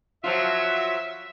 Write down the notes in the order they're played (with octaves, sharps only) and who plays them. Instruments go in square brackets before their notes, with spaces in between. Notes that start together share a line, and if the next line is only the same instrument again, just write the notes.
[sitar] F3 F#3 F4 [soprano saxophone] E5